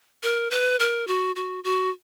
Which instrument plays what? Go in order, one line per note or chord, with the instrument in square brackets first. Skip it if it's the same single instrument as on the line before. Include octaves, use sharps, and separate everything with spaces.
[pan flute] A#4
B4
A#4
F#4
F#4
F#4